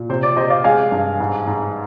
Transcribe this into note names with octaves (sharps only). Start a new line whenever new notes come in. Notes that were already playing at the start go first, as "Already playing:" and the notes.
Already playing: A#2
C3 C5
D5
C3 C5 D#5
D5 F5
G#3 F5 G#5
G2
G#2
G#2